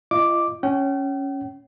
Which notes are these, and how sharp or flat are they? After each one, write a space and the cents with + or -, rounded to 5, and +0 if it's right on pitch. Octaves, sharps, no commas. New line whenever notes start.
F4 -40 D#5 -15 D6 +0
C#4 +0 G5 -40